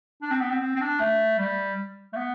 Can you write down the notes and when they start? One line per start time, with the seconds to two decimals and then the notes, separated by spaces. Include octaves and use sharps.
0.22 D4
0.31 C4
0.41 B3
0.51 C4
0.61 C4
0.76 C4
0.81 D4
1.00 A3
1.39 G3
2.13 A3
2.17 B3